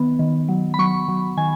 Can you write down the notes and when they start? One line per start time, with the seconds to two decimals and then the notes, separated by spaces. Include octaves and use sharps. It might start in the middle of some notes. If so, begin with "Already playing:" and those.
Already playing: D#3 B3
0.19 D#3
0.48 F#3
0.74 B5
0.79 F#3 C#6
1.08 F#3
1.37 D#3 G#5